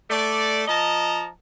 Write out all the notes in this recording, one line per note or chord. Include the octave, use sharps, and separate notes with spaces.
A3 D5
F3 D#5 A5 A#5